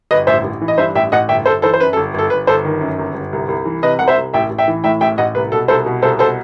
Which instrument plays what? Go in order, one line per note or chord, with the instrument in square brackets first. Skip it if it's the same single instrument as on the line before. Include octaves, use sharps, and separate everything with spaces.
[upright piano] G1 B4 D#5
A1 C5 E5
A1
E3
D#5
G2 C5 E5
A1 E5 G5
A1 D#5 F#5
G1 E5 G5
G1 A4 C5
E3 A4 C5
C5
F#2 B4
A4
G1
G1 A4
G1 B4
G1 A4 C5
D#3
F#2
G1
G1
C2
C2
E3
C3 B4 D#5
C2 F#5
C5 E5
C2
A1 E5 G5
A1
E5 G5
E3
A2 E5 G5
A1 E5 G5
A1 D#5 F#5
C2 B4
B2 A4
C2 A4 C5
B2
C2 A4 C5
B2 A4 C5